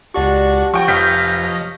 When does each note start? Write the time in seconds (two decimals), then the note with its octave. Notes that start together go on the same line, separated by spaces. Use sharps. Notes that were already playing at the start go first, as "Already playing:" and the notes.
0.14 C#2 D4 F#4 G4 D5 C#6
0.74 F3 F#4 C#5 G5 C#6 A#6
0.88 F1 C#5 D#5 F5 G6 B6